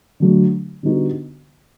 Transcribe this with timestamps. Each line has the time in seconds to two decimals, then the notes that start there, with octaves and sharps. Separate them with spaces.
0.20 D3 F#3 A3
0.83 D3 G3 B3 D#4 F#4